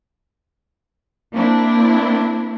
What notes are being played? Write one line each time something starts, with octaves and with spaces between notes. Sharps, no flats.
A#3 C4 D4 E4